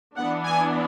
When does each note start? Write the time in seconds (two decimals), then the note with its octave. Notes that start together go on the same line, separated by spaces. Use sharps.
0.16 E3 B3 D4 F#5
0.46 G#5